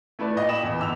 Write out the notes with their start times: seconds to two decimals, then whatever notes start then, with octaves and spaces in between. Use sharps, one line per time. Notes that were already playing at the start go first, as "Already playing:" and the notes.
0.19 A3 E4 B4 D5
0.36 A#2 D#5
0.49 G5 B5 D#6 E7 F#7
0.63 E2 E3
0.79 G1 E6 F7